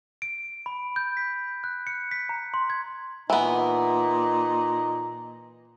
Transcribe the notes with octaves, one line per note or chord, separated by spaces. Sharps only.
D7
B5
G6
B6
F#6
C#7
B6
A#5
C6
G#6
A#2 E3 B3 D#4